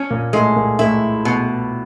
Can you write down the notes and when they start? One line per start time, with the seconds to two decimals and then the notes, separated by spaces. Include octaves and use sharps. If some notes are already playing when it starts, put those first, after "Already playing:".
Already playing: C#4
0.10 A#2 A#3
0.33 A2 G#3 A3
0.56 A#2 A#3
0.79 A2 A3 E4
1.25 B2